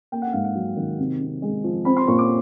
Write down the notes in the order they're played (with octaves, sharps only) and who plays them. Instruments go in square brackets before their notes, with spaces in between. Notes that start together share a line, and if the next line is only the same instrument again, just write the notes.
[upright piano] A#3 G5
F#5
G#2 F5
F#5
F#3
D#3
C3
C3
G#3
F3
C4 B5
C6
A#2 C#6
D6